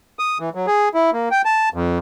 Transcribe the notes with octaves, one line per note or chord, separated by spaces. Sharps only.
D#6
E3
F#3
G#4
E4
A#3
G5
A5
F2